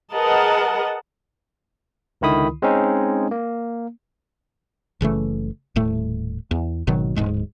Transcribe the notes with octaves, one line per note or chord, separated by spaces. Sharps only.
G#4 A#4 B4 D#5 F#5 A5
C#2 D3 D#3 E4 B5 D#6
G#3 C4 C#4 D#4
A#3
F#1 C#3 E3 A3
D#1 A2 A3
E2
G#1 B2 D#3 F#3
D1 G#2 G#3